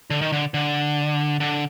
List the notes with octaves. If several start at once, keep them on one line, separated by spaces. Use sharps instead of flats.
D3
D#3
D3
D3
D3